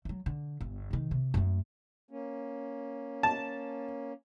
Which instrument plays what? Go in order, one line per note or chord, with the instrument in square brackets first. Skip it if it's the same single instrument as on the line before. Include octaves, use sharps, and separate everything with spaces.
[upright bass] F#3 A3
D3
G1
C3 D#3
C3
F#2 A3
[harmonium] A#3 C#4
[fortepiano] A5